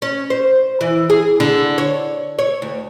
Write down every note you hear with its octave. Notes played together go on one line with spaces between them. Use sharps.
C#4
C5
E3
G#4
D3
C#5
C#5
D2